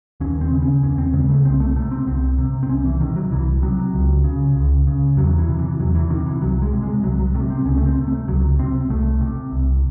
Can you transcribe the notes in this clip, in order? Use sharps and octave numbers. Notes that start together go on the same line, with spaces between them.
D#2 C#4
C4
C#3
C#4
D#2 C#4
C4
C#3 G#3
A3
C2 C4
A3
C3 A3
C4
C2 C4
C3
C4
C2 C#4
E3
C3 D#3
F#3
C2 E3
C3 F#3
C#2
C#3
C#2
C#3
E2 F#3
E3
C3
E3
E2 F#3
E3
C3 D#3
E3
C2 F#3
G#3
C3
G#3
C2 F#3
F#3
C3 A3
C4
C#2 C#4
A3
C4
C3
A3
C#2 F#3
C3 C4
C2 A3
C3
C2